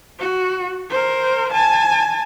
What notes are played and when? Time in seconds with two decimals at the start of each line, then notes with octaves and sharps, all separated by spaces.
0.19 F#4
0.90 A#4 C5
1.52 G#5 A5